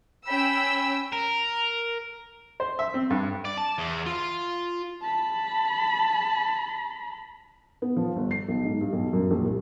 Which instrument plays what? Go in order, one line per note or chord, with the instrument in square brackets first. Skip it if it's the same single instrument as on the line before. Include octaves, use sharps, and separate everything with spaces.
[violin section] C#4 G5 E6 [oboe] B5
[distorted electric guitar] A#4
[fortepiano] C5
E5
C4
G2
[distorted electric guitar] D5
A5
E2
F4
[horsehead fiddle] A5 B5
[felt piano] B3
F3
G1
C7
B1
G#2
G2
B1
F#2
A#1
C2